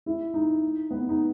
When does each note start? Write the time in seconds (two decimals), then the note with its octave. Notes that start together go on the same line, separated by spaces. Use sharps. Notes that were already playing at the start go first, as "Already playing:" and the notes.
0.06 E4
0.34 D#4
0.91 B3
1.09 D#4